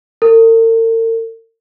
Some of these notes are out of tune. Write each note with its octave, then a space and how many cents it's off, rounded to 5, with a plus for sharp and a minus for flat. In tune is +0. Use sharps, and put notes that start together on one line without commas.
A#4 -45